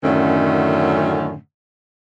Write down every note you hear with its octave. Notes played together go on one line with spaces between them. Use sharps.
F#2 A2 D3 D#3 A3 C#4